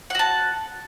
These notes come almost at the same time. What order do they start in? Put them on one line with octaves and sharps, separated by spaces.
F#5 F#4 A5